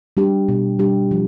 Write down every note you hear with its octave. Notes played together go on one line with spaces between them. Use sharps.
G3 D4 G4
B2
G3 D4 G4
F3